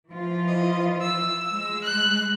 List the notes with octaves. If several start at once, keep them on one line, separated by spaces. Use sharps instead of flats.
E3 F3 F4
D#5
E6
G#3
F#6